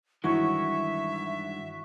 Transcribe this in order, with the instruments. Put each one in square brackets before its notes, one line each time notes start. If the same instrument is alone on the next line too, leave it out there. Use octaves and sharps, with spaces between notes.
[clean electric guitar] G2 D#3 G#3 [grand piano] E3 [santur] F#4 C#5 C#6 [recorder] E5